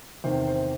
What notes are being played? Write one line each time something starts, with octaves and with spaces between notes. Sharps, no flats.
E2 C3 D#3 C5
C5